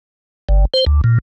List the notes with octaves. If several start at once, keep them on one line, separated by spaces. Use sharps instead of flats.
G1
C5
D2
A#2